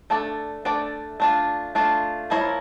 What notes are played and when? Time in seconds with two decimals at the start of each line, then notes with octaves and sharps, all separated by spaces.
0.10 A3 D4 A4 D5
0.65 A3 D4 A4 D5
1.20 A3 D4 F4
1.75 A3 D4 F4
2.30 F3 A#3 E4 A#4 C#5